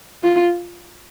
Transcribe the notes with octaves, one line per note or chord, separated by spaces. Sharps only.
F4